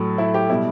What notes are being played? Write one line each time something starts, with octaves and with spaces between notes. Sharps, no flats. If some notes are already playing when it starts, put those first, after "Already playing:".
Already playing: A2 F#3 A4
E4
G4
B2 G3 E4